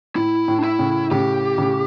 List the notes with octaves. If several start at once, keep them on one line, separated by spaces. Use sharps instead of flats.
A2 E4
A2
D4
E4
A2 C#3
A2 C#3 G4
A2 C#3